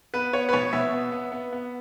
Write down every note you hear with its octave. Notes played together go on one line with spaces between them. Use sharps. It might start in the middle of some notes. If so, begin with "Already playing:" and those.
B3 B4
B3 C#5
B4
B2 C#5
B2 E5
B3
B3
B3
B3